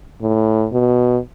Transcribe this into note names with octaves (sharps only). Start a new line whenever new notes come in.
A2
B2